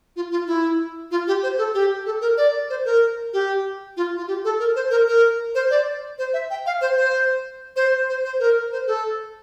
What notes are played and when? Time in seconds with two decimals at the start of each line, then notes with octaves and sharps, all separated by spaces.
0.16 F4
0.31 F4
0.47 E4
1.11 F4
1.27 G4
1.43 C5
1.58 A4
1.74 G4
2.06 A4
2.21 A#4
2.37 D5
2.70 C5
2.85 A#4
3.33 G4
3.97 F4
4.17 F4
4.27 G4
4.44 A4
4.59 A#4
4.76 C5
4.91 A#4
5.08 A#4
5.55 C5
5.70 D5
6.18 C5
6.33 E5
6.50 G5
6.66 F5
6.81 C5
6.97 C5
7.76 C5
8.09 C5
8.25 C5
8.40 A#4
8.72 C5
8.87 A4